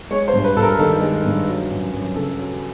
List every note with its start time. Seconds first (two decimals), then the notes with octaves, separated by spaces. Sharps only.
0.11 G#3 C#5
0.28 C5
0.34 G2
0.44 B4
0.57 G2 A4
0.62 A#4
0.79 D#3 A4
1.01 G#3
1.25 G2
1.47 F#3
1.71 F#2
1.93 F#2
2.16 C#3 A4
2.38 F#3